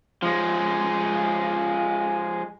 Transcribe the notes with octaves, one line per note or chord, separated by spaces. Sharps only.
F3 G#3